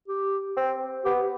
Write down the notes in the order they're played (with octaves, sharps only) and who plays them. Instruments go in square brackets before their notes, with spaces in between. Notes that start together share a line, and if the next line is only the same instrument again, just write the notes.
[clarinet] G4
[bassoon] C4
[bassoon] B3 [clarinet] G4